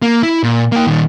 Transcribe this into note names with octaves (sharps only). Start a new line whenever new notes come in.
A#3
E4
A#2
A#3 G5
A#2 D#3